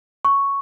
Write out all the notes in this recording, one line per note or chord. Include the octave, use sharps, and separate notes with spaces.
C#6